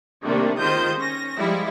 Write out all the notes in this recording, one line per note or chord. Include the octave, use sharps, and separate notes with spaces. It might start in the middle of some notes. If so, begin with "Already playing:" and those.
C3 D#3 G3 A3 A#3 D4
D#3 G#3 F4 C5 D#6 G6
C#4 A#6
F3 G3 G#3 E4